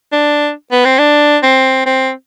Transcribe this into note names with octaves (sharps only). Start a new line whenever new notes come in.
D4
B3
C4
D4
C4
C4